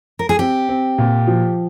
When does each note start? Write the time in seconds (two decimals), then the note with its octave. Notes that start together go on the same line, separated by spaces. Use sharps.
0.19 A#4
0.29 G#4
0.39 C4 G4
0.69 C4
0.98 A#2
1.27 F3